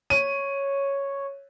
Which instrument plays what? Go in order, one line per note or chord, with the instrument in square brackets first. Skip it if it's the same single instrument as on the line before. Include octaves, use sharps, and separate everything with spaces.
[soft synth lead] C#5 [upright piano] D#7